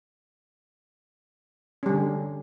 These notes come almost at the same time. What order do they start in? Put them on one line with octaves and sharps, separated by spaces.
C#4 G3 D3